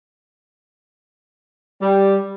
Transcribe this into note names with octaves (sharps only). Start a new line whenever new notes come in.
G3